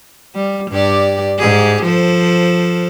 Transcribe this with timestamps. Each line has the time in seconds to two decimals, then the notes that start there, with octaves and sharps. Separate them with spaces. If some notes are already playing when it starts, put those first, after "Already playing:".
0.35 G3
0.71 G2 G4 D5
1.38 G#2 G4 G#4
1.84 F3 A4 C5